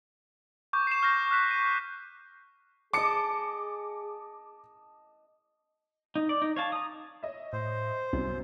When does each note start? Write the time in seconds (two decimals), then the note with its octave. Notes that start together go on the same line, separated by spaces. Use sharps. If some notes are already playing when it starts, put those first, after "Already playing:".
0.73 C#6 D6 G6
0.87 C7 E7
1.03 F6 G6 A#6 E7
1.31 F6 F#6 B6 E7
1.51 D#7
2.93 G#4 D#5 A5 D6 C#7
6.15 D#4
6.29 D5
6.42 D#4
6.56 C#5 F5 A5
6.72 A#5 D#6
7.23 C#5 D#5 E5
7.53 A2 C5
8.13 C2 F#2 F#3 B3